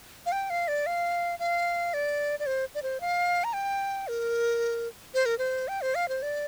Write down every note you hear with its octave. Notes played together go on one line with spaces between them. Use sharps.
F5
G5
F5
D5
F5
F5
D5
D5
C5
D5
C5
F5
A#5
G5
A#4
C5
A#4
C5
G5
C5
F5
C5
D5